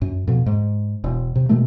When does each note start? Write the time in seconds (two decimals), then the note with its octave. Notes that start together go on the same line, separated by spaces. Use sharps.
0.02 F#2
0.27 F2 B2
0.46 G#2
1.04 E1
1.36 C3
1.49 B2 D#3 G#3 A3